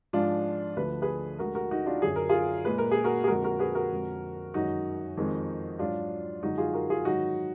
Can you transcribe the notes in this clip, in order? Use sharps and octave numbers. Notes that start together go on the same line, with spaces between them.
G#2 F3 G#3 D4 F4
D2 D3 F3 B4
G#4 B4
D2 D3 G#3 F#4 A#4
F#4 A#4
D#4 F#4
D4 F4
F#2 D3 F#3 G#4
A#4
F4 G#4
A#2 G#3 B4
A#4
G#4
F#4 A#4
G#4
F2 D3 G#3 F#4 A#4
F#4 A#4
G#4 B4
F#4 A#4
F2 D3 F3 G#3
F#2 D#3 G#3 D#4 F#4
F2 D#3 G#3
G#2 F#3 D4 F4
F#2 D3 F3 G#3 D#4 F#4
F4 G#4
F#4 A#4
F4 G#4
G#2 D#3 F#3 D#4 F#4